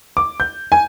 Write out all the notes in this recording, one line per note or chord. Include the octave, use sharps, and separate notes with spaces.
D6
G6
G#5